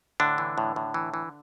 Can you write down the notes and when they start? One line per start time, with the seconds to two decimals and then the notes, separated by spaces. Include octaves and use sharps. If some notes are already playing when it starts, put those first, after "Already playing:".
0.20 A2 D3 D4
0.38 E3
0.58 A2
0.76 A2
0.94 E3
1.14 E3